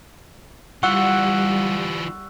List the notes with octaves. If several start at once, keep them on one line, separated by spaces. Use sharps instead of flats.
E3 G3 F4 F#5 C#6 E6 F#6